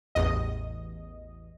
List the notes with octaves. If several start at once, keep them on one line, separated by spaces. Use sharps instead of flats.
A1 E2 D#5